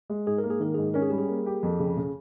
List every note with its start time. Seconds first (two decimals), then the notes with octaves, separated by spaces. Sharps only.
0.10 G#3
0.26 G#2 G#4
0.38 A#4
0.43 A#3
0.50 G#4
0.60 D#3 A#4
0.75 G#2 G#4
0.94 C#4 A#4
1.02 G#4
1.10 G3 G4
1.18 G#4
1.28 A#3
1.46 G4
1.63 F2
1.79 C#3
1.97 C#3